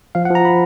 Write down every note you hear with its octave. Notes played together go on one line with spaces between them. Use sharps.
F3 F5
F#5
F3
A#5
B5